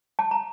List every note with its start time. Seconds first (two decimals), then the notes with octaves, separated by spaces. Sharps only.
0.19 A5
0.31 A#5